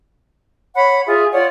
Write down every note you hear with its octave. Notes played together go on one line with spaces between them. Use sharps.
C#5 F#5 B5
F4 G#4 E5
F4 C#5 D5 F#5